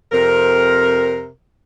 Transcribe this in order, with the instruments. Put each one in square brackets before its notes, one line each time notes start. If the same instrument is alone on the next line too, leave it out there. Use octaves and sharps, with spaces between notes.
[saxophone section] F2 C3 A#4